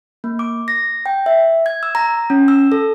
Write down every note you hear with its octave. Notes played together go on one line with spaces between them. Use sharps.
A#3
D6
A#6
G5
E5
G#6
E6
A#5
C#4
E6
A4